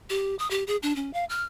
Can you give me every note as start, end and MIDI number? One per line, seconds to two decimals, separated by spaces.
0.10 0.35 67
0.39 0.49 87
0.50 0.64 67
0.67 0.76 68
0.83 0.95 62
0.96 1.11 61
1.13 1.25 77
1.29 1.43 89